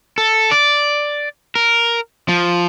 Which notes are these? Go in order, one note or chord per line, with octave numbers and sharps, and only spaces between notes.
A4
D5
A#4
F3